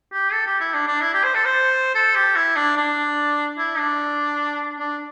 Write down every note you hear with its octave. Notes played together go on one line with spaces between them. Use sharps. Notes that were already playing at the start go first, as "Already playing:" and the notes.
G4
A4
G4
E4
D4
D4
E4
G4
C5
A4
C5
A4
G4
E4
D4
D4
E4
D4
D4